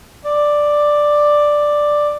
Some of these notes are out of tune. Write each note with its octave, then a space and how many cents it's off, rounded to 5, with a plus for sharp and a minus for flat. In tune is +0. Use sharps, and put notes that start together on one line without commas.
D5 +5